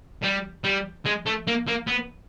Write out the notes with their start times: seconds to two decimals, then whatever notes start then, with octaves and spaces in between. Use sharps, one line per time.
0.23 G3
0.64 G3
1.06 G#3
1.26 A3
1.47 A#3
1.68 A#3
1.88 B3